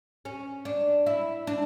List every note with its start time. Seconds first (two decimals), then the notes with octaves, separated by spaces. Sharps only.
0.25 C#4
0.65 D4
1.06 E4
1.47 D4